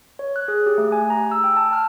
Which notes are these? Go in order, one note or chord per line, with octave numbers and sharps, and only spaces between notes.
C#5
F#6
G#4
G4
A3
G#5
A#5
E6
G5
A5
F6